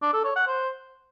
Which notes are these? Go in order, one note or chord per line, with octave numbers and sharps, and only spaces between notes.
D4
A4
C#5
F#5
C5